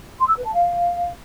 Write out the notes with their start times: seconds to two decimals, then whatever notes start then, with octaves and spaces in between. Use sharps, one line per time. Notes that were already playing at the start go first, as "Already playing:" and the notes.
0.19 C6
0.27 E6
0.36 B4
0.45 A5
0.53 F5